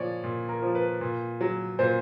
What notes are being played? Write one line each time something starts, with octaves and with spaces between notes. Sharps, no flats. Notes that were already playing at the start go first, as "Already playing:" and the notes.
Already playing: A#2 F3 C#5 D5
A#2
A#4
F3
B4
A#2
F#3
A#2 C5